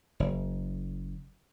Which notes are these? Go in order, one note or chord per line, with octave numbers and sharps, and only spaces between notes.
F#1